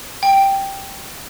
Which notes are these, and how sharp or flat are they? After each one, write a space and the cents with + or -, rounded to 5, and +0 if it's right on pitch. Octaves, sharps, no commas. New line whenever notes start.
G5 +0